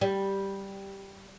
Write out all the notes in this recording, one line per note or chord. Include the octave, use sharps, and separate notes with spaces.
G3